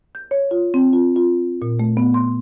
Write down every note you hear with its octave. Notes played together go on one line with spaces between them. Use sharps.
G6
C#5
F4
C4
F4
F4
A#2
A3
B3
C6